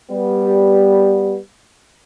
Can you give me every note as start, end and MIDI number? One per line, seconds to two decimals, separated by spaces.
0.11 1.38 55
0.11 1.38 59